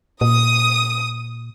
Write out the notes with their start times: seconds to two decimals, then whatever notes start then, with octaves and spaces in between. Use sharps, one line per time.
0.21 A#2 D#6